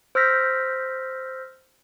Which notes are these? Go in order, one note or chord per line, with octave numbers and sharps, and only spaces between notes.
C5 E6 F6 G6 A#6 B6